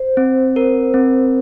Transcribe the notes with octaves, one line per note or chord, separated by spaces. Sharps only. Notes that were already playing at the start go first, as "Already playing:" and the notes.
Already playing: C5
C4
A#4
C4